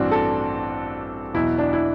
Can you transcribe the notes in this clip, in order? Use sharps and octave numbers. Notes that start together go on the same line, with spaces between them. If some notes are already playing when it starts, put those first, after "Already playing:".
Already playing: A1 G2 E3 C4 D4 F#4
A4
E2 B2 F#3 E4
D4
E4